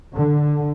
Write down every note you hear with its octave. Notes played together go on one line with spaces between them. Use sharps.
D3